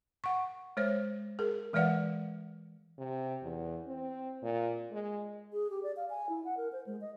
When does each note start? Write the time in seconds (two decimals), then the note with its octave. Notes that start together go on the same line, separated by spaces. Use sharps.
0.24 F#5 C#6
0.77 G#3 C5 C#5
1.39 G#4 A#4
1.73 E3 G#3 B4 D5 F5 F#5
2.98 C3
3.43 E2
3.86 C4
4.43 A#2
4.92 G#3
5.53 G#4
5.70 G4
5.83 D5
5.96 F5
6.10 G#5
6.29 E4
6.45 F#5
6.57 A#4
6.72 C5
6.87 G#3
7.01 D#5